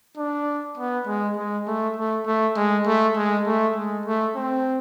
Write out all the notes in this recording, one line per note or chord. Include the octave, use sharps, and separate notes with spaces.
D4
B3
G#3
G#3
A3
A3
A3
G#3
A3
G#3
A3
G#3
A3
C4